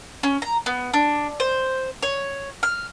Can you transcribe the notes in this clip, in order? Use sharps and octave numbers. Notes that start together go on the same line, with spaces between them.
C#4
A#5
B3
D4
C5
C#5
F6